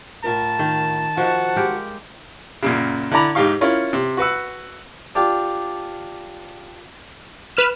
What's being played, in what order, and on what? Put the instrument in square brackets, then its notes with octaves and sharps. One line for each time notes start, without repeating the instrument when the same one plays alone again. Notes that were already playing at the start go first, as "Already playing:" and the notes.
[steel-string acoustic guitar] A2 F4 A#4 [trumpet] A5
[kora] D#3
[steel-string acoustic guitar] D#3 F#4 C#5 [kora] F3 [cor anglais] F#5
[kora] G#3 G4 A#4
[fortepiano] F#2 A#2 C#3
D3 E4 D5 A#5 B5
G#2 D#4 G4 F5 C#6
C#4 E4 F4 A#4 C#5
C3
F#4 B4 F#5 E6
[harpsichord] D4 F4 G4
[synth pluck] B4 F6 E7